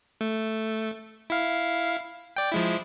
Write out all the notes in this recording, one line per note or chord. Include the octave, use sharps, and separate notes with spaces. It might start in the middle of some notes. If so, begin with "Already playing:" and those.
A3
E4 F5
D5 G5
F3 G#3 E4